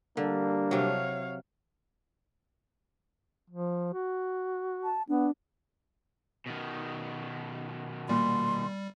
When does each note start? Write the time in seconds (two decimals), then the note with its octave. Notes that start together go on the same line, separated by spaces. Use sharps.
0.17 D3 G3 A#3 D4
0.71 C3 F#3 C#5 F5
3.50 F3
3.93 F#4
4.84 A5
5.09 B3 D4
6.47 B2 D#3
8.09 A#2 G3 C6